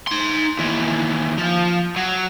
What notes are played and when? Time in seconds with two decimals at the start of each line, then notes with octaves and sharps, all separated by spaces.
0.08 D#4 C6
0.59 D#2 E3
1.38 F3
1.96 F#3